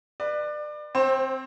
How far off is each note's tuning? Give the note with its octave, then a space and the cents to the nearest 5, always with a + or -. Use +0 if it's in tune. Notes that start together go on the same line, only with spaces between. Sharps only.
B4 +0 D5 +30
C4 +0 C5 +30